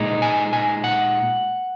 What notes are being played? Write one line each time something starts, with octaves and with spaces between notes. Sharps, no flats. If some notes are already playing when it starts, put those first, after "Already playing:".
Already playing: A#2 G#3 D#4
G#5
G#5
F#5